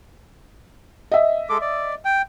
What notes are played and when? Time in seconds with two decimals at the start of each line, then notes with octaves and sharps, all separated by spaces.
1.12 D#5 E5
1.49 G#3 A4 D6
1.61 D5
2.05 G5